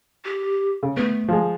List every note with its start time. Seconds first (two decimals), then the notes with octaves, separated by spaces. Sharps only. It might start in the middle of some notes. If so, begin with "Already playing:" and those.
0.25 G4
0.83 C#3
0.97 A3 B3
1.29 F3 G#3